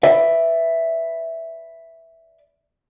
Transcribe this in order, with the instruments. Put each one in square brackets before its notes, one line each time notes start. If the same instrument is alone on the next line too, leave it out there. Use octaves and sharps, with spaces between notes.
[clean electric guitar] B4 D5 E5